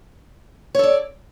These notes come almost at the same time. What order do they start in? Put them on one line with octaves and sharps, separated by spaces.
C#5 A4 D5